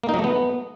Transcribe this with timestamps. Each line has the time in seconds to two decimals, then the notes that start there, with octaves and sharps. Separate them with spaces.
0.04 A#3
0.09 D#4
0.14 F#3
0.19 A3
0.24 B3